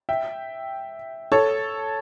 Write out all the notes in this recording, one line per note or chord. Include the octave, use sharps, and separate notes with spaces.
E5 G5
A4 C#5